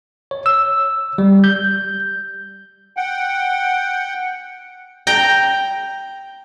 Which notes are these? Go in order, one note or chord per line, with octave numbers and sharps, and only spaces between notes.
C#5
E6
G3
G6
F#5 G5
G5 A#5